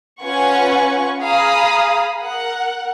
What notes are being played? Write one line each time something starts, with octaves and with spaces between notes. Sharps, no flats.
C#4 F4 B4 F#5 G#5 C#6
G#4 F5 A#5 B5 D#6
A#4 F#5